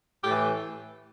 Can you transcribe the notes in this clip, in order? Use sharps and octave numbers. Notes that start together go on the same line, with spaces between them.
A2 E3 G4